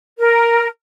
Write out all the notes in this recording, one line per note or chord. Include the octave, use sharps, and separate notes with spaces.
A#4